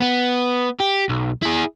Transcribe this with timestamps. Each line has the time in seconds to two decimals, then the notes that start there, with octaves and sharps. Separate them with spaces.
0.01 B3
0.80 G4
1.09 B1
1.42 E4 G#4